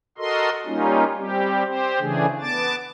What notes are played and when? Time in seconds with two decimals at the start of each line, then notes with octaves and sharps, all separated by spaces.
0.18 F#4 A4 A#4 D#5 C6
0.66 G3 A#3 C#4 D#4 F4
1.17 G3 C4 G4
1.65 C4 G4 C5
2.00 C#3 E3 A3 D4 G#4
2.41 B3 A5 D6 A6